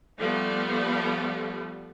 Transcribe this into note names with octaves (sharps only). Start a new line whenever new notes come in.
F3 G3 A3 B3